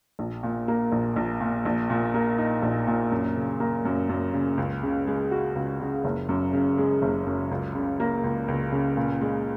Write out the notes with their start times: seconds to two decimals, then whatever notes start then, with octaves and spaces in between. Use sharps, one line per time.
0.19 A#1
0.43 A#2
0.68 A#3
0.92 A#1
1.16 A#1
1.41 A#2
1.65 A#1
1.90 A#2
2.14 A#3
2.38 D#4
2.62 A#1
2.87 A#2
3.12 F#2
3.36 C#3
3.60 A#3
3.85 F#2
4.09 F#2
4.33 C#3
4.58 C#2
4.83 C#3
5.07 G#3
5.31 F#4
5.55 C#2
5.80 C#3
6.04 F#1
6.29 F#2
6.53 C#3
6.78 G#3
7.02 F#1
7.26 F#2
7.51 C#2
7.75 C#3
8.00 A#3
8.24 C#2
8.48 C#2
8.72 C#3
8.97 A#2
9.21 G#3